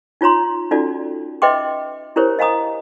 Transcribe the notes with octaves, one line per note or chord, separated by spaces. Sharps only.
D#4 F4 C#5 A#5 C6
C#4 D#4 F4 F#4 A4 D5
B4 D#5 E5 G5 C6 D6
D4 E4 G4 A#4 C5 C#5
D#5 F5 G#5 A#5 D#6